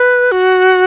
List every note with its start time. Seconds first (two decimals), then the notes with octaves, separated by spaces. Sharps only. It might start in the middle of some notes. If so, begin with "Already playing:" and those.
Already playing: B4
0.32 F#4